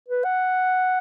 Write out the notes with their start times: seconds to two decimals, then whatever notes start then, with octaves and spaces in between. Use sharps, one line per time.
0.08 B4
0.24 F#5